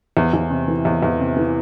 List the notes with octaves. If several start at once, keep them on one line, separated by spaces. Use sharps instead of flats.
E2
E2
C3
E3
E2
E2
C3
E3